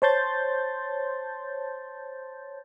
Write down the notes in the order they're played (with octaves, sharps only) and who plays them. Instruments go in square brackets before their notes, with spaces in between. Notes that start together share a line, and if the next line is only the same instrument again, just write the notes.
[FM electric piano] C5 C#5 A5 C6 G6 A6